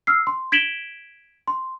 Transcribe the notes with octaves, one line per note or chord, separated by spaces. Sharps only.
E6 F6 C7
C6
G#6 B6 D7 E7 F#7 G7
C6